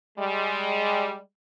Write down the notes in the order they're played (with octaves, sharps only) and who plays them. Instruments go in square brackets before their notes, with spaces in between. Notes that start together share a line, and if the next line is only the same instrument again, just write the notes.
[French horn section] G3 G#3